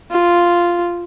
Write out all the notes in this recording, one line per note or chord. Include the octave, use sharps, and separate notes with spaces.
F4